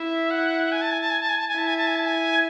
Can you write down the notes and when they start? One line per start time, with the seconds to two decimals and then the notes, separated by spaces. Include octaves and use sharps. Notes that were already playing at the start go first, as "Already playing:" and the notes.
Already playing: E4 E5
0.31 F#5
0.72 G#5
0.82 A5
0.91 G#5
1.01 A5
1.10 G#5
1.20 A5
1.29 G#5
1.38 A5
1.48 G#5
1.55 E4 A5
1.67 G#5
1.78 A5
1.87 G#5
1.96 A5
2.05 G#5